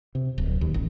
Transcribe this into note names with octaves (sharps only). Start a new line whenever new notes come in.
C3
D1
D#2
A1